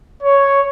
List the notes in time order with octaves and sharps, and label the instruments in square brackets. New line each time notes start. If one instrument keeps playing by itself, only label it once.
[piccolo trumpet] C#5